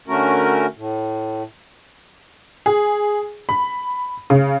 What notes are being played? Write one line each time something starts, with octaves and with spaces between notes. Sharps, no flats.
D3 A3 C#4 F#4 A#4
A2
G#4
B5
C#3